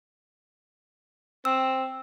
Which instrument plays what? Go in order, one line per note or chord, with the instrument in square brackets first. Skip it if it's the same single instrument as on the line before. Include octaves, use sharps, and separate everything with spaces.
[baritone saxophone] C4 [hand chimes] E6